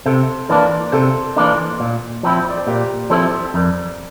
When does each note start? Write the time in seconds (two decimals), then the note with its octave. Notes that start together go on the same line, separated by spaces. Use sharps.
0.06 C3 A4 C5
0.49 E3 A#3 D4 A#4 D5
0.92 C3 A4 C5
1.36 E3 A#3 D4
1.80 A#2
2.23 F3 C4 E4
2.49 D5
2.57 C5
2.67 A#2 G4 A#4
3.10 F3 C4 E4 A4 C5
3.54 F2 A#4 D5